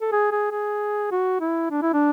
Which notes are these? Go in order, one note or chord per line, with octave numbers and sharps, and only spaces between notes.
A4
G#4
G#4
G#4
F#4
E4
D4
E4
D4